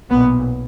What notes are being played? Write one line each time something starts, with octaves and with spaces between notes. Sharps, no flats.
B1 A#2 B3